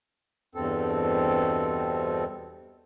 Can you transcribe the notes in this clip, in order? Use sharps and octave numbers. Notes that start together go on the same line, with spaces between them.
E2 G2 B2 C4 A4